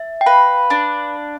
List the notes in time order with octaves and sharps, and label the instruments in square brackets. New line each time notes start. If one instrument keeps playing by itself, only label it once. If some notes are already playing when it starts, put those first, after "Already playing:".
Already playing: [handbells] E5
G5
[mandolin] B4 [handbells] F5
[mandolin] D4